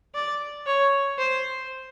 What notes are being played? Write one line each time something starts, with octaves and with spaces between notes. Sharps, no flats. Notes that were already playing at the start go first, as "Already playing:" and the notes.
D5
C#5
C5